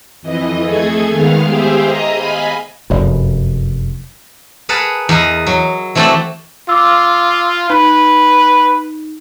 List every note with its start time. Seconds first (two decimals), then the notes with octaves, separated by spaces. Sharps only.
0.22 F2 E3 D#5
0.65 A3 G#4 A4 G#6
1.11 D#3 G#3 B3 F5 F6
1.46 G4 G#4 C5 E5 F5
1.84 D#5 A#5 D#6
2.15 D#5 F5 G#5 B5
2.90 F1 F#2
4.69 G#4 A#4 B4 F#5 A5
5.09 E2 A#4 D#5
5.47 F#3
5.95 E3 A3 C4 F#4 D5 A5
6.69 F4 D6 E6
7.70 D#4 B4